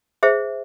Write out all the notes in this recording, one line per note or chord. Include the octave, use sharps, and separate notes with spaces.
G#4 C5 E5